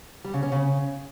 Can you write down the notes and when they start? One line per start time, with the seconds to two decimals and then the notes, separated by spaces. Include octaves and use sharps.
0.24 G3
0.34 C#3
0.43 C#4
0.52 C#3